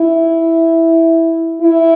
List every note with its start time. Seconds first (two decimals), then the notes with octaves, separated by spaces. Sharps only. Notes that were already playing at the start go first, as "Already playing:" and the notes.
Already playing: E4
1.61 E4